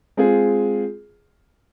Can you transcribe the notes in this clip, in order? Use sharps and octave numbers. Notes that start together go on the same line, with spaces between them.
G#3 C4 F4 G#4